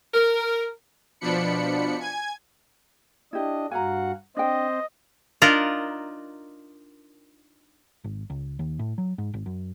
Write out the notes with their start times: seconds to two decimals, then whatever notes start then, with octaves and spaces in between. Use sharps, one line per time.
0.14 A#4
1.21 B2 F3 D4 B5 C#7
2.00 G#5 G#6
3.33 D4 E4 G4 D#5
3.71 G2 F#4 F5 F#5 G#5 A#5
4.37 C4 D4 C5 D#5 G5
5.42 D4 D#4 F4 A#4
8.04 G#1
8.30 C#2
8.59 D#2
8.79 A2
8.98 F#3
9.18 G#2
9.34 G#1
9.46 F#2